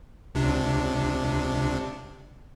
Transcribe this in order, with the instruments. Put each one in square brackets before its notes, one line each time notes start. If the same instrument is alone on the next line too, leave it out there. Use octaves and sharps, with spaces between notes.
[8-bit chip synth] C#2 C3 D4